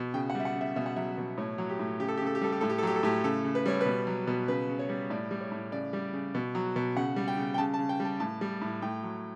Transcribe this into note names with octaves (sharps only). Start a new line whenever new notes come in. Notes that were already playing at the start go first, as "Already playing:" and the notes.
Already playing: B2
C#3 G5
F#5
G3 E5
F#5
C#3
E5
B2 E5
F#5
F#3 E5
B2
A2 C#5
F#3
G4
A2
C#3 G4
A4
G4
C#3
A4
G4
G3 A4
G4
A2 A4
G4
A4
F#3 G4
A4
A2 G4
C#3 A4
C#3
B4
G3 C#5
B4
B2
F#3
B2
C#3 B4
C#3
C#5
G3
A2 D5
G3
C#5
A2
C#3 D5
G3
C#3
B2
F#3
B2
C#3 F#5
G3
G5
C#3
G5
C#3 A5
A5
C#3
G5
G3
A5
A2 A5
G3
A2
A2 G5
F#3